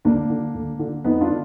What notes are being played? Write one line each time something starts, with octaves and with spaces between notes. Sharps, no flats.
D2 A#3 D4
D3
D2
D3
F2 B3 D#4
D4 F4
D3